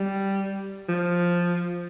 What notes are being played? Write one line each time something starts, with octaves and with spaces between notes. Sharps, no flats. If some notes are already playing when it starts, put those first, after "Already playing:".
Already playing: G3
F3